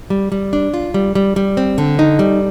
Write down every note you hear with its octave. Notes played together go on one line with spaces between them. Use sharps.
G3
G3
D4
F4
G3
G3
G3
C4
D3
D#4
G3